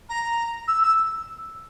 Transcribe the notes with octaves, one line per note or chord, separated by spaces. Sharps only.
A#5
E6
E6